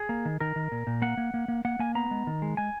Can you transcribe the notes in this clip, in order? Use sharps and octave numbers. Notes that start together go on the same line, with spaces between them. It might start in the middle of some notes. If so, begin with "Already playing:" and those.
Already playing: G#4
A#3
D#3
D#3 A#4
D#3
A#2
A#2
A#3 F#5
A#3
A#3
A#3
A#3 F#5
A#3 G#5
B3 A#5
G#3
D#3
G#3
G#3 G#5